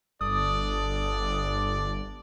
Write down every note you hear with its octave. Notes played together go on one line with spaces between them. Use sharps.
G1 D4 A4 D5 D#6